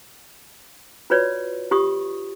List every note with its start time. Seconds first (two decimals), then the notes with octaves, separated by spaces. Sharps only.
1.10 F4 F#4 B4 C#5 D5
1.71 F4 G4 C#6 D#6